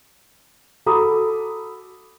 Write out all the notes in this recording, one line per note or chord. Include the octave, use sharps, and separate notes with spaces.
F#4 A4 A#5 B5 D6 D#6